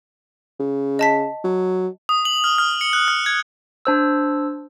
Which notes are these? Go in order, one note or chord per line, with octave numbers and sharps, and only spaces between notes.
C#3
D#5 A5 B6
F#3
D#6
F#7
F6
F6
C#7
F#6
F6
G#6
D4 C5 E6